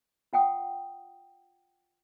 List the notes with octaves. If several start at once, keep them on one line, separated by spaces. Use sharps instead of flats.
F4 F#5 G5 D#6